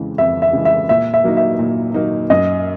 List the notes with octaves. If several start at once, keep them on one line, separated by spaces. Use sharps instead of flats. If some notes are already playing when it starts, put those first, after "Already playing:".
Already playing: F2 C#3 E3 G#3
F2 E5
E5
C#3 E3 G#3
E5
A#2 E5
E5
F#3 A#3 D#4
E5
A#2
F#3 A#3 D#4
F#2 D#5